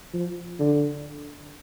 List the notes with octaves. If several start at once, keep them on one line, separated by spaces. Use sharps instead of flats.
F3
D3